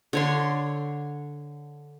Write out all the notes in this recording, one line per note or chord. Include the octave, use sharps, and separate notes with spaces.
D3 C#5 C6